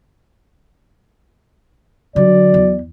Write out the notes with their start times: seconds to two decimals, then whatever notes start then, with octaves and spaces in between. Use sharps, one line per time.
2.16 D3 F#3 D5
2.54 E2